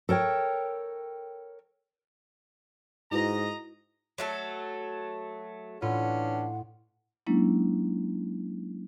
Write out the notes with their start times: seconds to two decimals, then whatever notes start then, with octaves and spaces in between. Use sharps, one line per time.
0.09 A4 A#4 C#5 G5
3.12 G#2 E4 F#4 B4 D#5 A#5
4.18 F#3 A3 A4
5.82 A2 E3 C#4 D4 F4 F#5
7.27 F#3 G#3 A#3 C#4 D4 E4